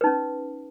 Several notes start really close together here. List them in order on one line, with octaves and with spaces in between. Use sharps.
B4 D#4 C#4